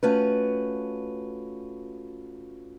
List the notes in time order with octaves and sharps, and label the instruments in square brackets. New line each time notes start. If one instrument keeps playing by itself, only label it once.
[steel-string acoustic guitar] A3 C#4 F4 F#4 B4